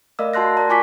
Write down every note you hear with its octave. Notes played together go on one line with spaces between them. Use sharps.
A3 A#4 D5 D#5 F5 E6
F#4 A5 C6 F#6 A#6
A#4 D5 A#5
F4 G#5 C#6 D6 B6